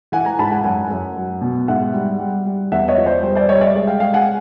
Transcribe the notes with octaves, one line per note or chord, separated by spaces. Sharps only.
E3 F#5 G#5
G#5 A#5
G#2 A5 B5
F#5 G#5
F#2 F#5 G#5
F#2
F#3
B2
G#2 E5 F#5
G3
G3
G3
E2 E5 F#5
C#5 D#5
F3
C5 D5
G3 C5
C5 D5
G3 C#5 D#5
D5 E5
G#3
F5 G5
G#3 F5 G5
F#5 G#5